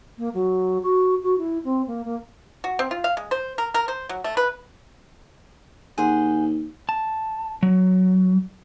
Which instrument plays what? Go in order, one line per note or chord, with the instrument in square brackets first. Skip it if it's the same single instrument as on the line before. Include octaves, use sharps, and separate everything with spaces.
[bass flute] A#3
F#3
F#4
F#4
E4
C4
A#3
A#3
[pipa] F#4
C4
F4
F5
G#3
C5
A#4
A#4
C5
F#3
A3
B4
[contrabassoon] D#2 [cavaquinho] G#4 C5 F#5
[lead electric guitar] A5
F#3